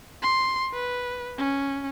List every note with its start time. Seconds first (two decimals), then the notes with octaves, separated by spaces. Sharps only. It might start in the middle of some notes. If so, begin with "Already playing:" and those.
0.22 C6
0.73 B4
1.38 C#4